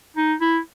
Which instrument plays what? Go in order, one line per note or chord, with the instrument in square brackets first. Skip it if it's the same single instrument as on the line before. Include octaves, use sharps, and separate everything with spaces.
[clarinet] D#4
E4